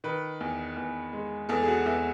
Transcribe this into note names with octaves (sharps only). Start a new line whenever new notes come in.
D#3 B4
E2
E2
G#3
E2 A4
G#4
F#4
E2 E5